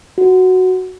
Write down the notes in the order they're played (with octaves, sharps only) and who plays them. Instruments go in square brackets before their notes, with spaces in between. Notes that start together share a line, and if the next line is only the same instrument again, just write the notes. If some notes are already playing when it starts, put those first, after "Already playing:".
[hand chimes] F#4